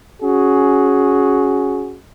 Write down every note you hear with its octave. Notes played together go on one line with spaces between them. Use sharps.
C#4 F#4 G#4